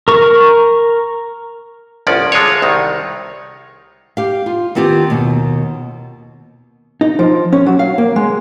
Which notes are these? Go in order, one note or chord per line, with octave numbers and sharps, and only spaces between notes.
A#4 C#6
G1 C2 F3 C#4 D5
D3 G#3 F4 A4 C#5
C2 D#3 D#4
G4 F5
F4
D#3 B3 C4 F4 G4
D#2 B2
D#4
F3
C#4
F#3
F5
A#3
G#3